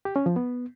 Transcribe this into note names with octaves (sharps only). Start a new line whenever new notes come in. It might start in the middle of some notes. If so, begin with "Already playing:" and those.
G4
C#4
F3
B3